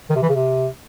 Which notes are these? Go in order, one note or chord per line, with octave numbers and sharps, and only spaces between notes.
D#3
C3
E3
C#3
C3